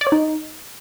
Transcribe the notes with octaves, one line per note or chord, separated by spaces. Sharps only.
D5
C#5
D#4